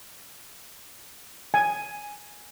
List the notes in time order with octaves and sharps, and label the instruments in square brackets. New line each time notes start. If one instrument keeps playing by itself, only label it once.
[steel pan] G#5